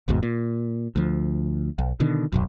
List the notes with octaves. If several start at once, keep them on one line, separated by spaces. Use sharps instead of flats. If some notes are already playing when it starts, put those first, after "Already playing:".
G1 D#2 G#2 B2
A#2
D2 F3
B1
B2 D3 D#3
D#1 B1 F#2